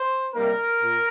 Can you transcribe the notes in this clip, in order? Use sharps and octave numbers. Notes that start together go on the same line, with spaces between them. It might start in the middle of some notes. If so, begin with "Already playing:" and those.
Already playing: C5
C3 G3 A#3 D#4 A#4
A#2